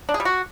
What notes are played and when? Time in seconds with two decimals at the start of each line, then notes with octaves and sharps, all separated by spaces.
0.09 D4
0.14 G#4
0.20 G3
0.25 F#4